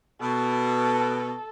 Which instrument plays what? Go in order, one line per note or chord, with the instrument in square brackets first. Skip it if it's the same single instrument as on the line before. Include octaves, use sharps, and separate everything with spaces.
[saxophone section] B2 [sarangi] A4